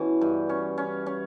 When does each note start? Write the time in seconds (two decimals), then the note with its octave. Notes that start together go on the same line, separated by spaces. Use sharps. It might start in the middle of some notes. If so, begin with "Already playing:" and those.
Already playing: B2 E3 C#4
0.21 G2
0.49 C#4
0.78 C#4
1.06 C#4